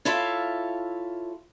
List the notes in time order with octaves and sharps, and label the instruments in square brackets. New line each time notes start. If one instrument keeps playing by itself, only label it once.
[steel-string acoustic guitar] E4 F4 A4 C#5 E5 F5